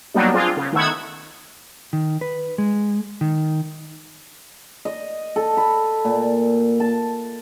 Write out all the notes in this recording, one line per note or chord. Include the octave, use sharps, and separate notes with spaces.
F#3 G3 A#3 B3 D4 D#4
C4 D4 F4 G#4
C#3
D#3 A3 B3 F#5 E6 G#6
D#3
B4
G#3
D#3
D#5
A4
B5
A#2
A5